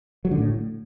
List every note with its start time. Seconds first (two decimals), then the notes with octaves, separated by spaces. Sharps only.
0.25 F#3
0.31 D3
0.38 A2